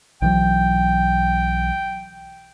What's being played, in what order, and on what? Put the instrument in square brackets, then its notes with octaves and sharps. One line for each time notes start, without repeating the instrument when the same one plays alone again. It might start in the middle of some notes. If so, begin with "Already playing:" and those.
[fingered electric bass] B1 E3 F#3 [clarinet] G5